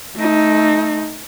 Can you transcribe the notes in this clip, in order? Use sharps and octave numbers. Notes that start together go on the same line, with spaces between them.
A3 D#4